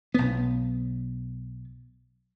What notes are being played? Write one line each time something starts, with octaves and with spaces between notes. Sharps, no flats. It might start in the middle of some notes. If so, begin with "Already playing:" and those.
B1 B3